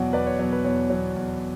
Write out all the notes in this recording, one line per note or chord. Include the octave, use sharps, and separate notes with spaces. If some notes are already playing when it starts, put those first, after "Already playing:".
Already playing: E2 B2 F#3 D5 F#5
E2 B4 D5
C#5
B2 F#3 C#5
B4
E2 C#5
B2 F#3
E2